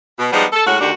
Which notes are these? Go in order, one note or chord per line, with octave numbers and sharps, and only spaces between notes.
B2
F3 G3 G#3 B3 D4 D#4
A4
A2 G#3 C#4 F#4
D2 D#3 D4 F#4 G4